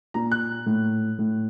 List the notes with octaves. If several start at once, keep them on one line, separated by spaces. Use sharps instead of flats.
A#2 A#5
F#6
A2
A2